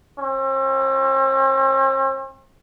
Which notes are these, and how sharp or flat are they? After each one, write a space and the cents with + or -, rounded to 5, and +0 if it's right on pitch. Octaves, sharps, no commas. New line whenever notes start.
C4 +45